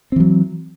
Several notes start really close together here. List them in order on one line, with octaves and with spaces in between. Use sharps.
C4 E3 F#3